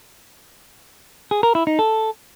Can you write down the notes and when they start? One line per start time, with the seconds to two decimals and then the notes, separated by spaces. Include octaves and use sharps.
1.31 G#4
1.43 A#4
1.55 E4
1.67 D#4
1.79 A4